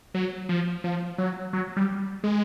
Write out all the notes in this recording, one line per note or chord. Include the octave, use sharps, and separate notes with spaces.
F#3
F3
F3
F#3
F#3
G3
G#3